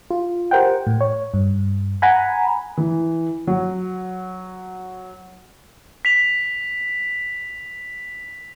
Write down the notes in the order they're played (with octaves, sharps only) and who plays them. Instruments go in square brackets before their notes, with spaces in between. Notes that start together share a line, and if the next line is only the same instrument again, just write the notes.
[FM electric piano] F4
G4 A#4 C5 F#5 G5
A2
C#5
G2
F#5 G#5 A#5 B5
[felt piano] E3
F#3
[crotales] B6 F7